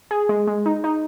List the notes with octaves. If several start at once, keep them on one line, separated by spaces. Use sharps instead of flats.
G#4
G#3
G#3
D#4
D#4